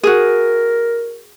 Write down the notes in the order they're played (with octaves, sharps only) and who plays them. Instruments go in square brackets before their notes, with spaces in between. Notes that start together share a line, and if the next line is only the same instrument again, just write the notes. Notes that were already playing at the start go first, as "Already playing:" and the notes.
[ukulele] F#4 G#4 [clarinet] A#4